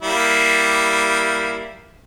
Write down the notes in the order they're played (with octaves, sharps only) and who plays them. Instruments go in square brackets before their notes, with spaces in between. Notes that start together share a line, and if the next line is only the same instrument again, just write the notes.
[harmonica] G3 A#3 E4